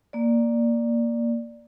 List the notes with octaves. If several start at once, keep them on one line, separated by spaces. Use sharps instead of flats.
A#3 D5